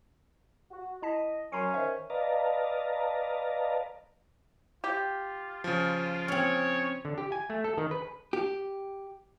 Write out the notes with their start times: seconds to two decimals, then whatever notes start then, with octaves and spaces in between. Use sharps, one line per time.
0.71 F#4
1.02 E4 D#5 A5 B6
1.52 F#2 F#3 C#4 A#5 C6 C7
1.74 D#3 C5 E5
2.10 B4 D5 D#5 F5 A5 A#5
4.84 F4 G4
5.64 C#3 F3
6.28 C4 C#4 C#5
7.05 D3
7.18 G4
7.32 G#5
7.50 A3
7.64 A4
7.78 D#3
7.91 B4
8.33 G4